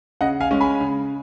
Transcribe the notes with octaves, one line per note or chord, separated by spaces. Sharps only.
C#3 D#5 F#5
F5 G#5
G#3 C#4
G#5 B5
C#3